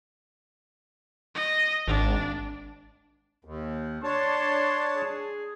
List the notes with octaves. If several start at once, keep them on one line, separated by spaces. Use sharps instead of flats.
D#5
G#1 D4
D#2
D4 C#5 A5 C6
G#4